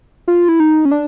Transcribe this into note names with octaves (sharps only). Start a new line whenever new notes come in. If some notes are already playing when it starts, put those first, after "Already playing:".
F4
E4
D#4
C#4
D4